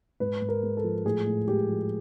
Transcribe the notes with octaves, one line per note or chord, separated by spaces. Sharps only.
G#2 B4
G#2
A#4
G#3
A4
F3
A2 G#4
A2
G#3 G4
F3